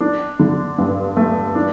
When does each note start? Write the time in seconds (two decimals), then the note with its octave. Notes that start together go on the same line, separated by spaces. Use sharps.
0.01 D4
0.40 D3
0.78 G2
1.17 A3
1.55 D4